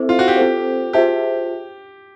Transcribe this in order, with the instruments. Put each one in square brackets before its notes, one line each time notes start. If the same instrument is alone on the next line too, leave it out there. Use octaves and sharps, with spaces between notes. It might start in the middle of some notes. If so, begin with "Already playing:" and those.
Already playing: [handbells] C4 E4 A4 C5 E5
[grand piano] F4
F#4
G4
[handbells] C4 F4 A4 C5
[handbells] F4 G#4 C5 E5 A5 [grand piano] G4